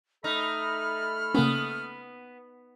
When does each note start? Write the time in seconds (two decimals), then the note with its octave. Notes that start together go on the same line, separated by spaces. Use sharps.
0.24 A3 D#4 A4 B5 F6
1.35 C#3 A#3 B3 C#4